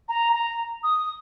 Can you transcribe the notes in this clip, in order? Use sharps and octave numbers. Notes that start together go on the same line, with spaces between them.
A#5
A#5
D#6